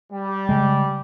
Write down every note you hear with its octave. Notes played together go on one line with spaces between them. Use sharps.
G3
C#3 G#3